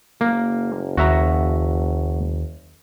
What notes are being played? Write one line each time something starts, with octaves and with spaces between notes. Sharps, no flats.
F#1 A#3
D#2 F#4 E5 A#5